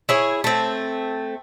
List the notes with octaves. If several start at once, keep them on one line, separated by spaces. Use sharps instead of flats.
E4 G#4 C#5
A3 C4